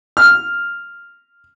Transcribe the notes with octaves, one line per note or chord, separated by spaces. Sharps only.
F6